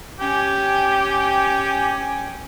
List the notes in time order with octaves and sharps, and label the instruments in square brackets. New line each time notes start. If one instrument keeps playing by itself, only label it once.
[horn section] C#4 G5 G#5 [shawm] G4